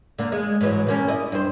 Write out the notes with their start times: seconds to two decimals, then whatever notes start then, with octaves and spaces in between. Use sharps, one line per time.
0.18 D3 A#3
0.32 G#3
0.61 G#2 E3 F#3
0.87 C3 A#3 C#4
1.08 E4 D5 D#5
1.32 G2 C5